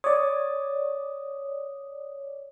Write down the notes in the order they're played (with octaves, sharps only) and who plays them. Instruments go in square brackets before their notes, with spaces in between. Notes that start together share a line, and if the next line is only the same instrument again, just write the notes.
[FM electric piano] C#5 D5 [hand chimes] D#6